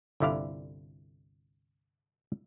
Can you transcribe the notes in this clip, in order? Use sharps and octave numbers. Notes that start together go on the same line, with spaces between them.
G1 C2 D3 E4 D5 F5